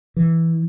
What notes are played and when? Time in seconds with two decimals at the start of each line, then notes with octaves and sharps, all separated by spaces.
0.17 E3